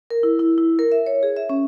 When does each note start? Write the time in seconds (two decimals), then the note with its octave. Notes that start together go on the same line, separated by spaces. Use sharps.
0.10 A#4
0.23 E4
0.39 E4
0.58 E4
0.79 A#4
0.92 E5
1.06 C#5
1.23 G#4
1.36 E5
1.50 C#4